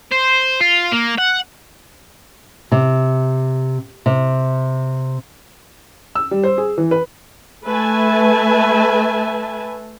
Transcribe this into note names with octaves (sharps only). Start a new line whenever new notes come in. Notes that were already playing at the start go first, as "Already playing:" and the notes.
C5
F4
A#3
F#5
C3
C3
E6
G3
C5
G#4
E3
B4
A3 B4 E5 G#5 A5